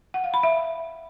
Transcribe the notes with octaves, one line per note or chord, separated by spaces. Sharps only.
F#5
F5
B5
E5